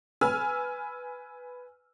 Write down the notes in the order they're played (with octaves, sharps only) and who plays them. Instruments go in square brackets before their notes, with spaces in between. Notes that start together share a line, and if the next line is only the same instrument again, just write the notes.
[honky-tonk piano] B4 G#5 E6 F6